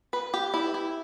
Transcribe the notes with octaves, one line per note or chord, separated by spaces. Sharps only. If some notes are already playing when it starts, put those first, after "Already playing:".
B4
G4
E4
E4